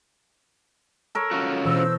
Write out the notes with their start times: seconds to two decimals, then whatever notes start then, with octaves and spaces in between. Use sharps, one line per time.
1.15 A4 A#4 C#5
1.31 C#4 F4 F#4
1.65 B2 E3 C5 E6